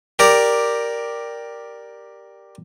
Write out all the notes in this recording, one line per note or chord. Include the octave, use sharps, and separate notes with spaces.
G4 A#4 D5